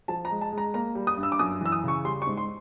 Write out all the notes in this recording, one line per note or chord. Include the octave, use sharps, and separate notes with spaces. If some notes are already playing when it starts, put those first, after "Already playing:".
F3 A5
A#5
G#3
A5
G#3
A#5
A#3 A#5
G3
D#6
G2
E6
D6
F#2 D#6
E3 E6
D#6
C#3
C#6
G3 C6
C#6
G#2
C6